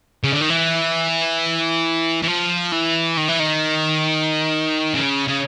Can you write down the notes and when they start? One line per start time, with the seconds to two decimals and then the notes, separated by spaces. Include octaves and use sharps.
0.24 C#3
0.33 D3
0.41 D#3
0.50 E3
2.23 E3
2.28 F3
2.72 E3
3.17 D#3
3.28 E3
3.40 D#3
4.95 C#3
5.28 C#3